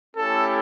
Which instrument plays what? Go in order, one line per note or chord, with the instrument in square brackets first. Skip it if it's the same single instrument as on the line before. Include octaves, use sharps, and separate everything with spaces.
[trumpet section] A3 C#4 E4 G4 A4